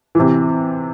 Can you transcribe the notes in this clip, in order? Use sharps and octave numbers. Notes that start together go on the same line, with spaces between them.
C3 E3